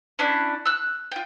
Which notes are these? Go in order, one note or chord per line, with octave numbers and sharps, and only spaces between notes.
C#4 D4 E4 F#6
E6 F#6
F4 G5